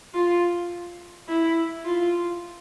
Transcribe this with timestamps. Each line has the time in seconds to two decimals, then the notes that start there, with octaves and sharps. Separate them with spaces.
0.14 F4
1.28 E4
1.85 F4